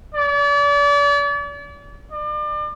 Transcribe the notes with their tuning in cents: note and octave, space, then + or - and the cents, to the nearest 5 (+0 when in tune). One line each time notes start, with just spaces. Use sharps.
D5 -40
D5 +35